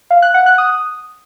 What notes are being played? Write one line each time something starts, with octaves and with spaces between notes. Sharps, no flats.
F5
F#6
F#5
F#6
D#6